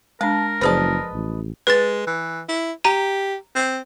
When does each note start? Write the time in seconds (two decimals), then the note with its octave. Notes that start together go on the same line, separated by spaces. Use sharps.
0.21 G#3 D4 A#4 A5
0.61 F#1 F3 G#4 B4 C5 D#5 A5
1.13 A1
1.67 G#3 B4 A6
2.07 E3
2.49 E4
2.84 G4 A#5 D#7
3.56 C4